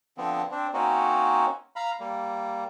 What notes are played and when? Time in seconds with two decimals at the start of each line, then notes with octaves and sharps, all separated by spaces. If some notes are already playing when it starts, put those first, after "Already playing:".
0.18 D3 F3 B3 C4
0.51 C4 D4
0.74 A#3 C4 C#4 D#4 F#4
1.76 F5 A#5 B5
2.00 G3 A#3